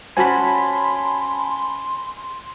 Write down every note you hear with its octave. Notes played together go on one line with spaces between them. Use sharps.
C#4 F#4 C5 G#5 A5 B5 C6